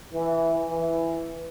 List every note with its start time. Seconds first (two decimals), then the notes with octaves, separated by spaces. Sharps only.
0.13 E3
0.69 E3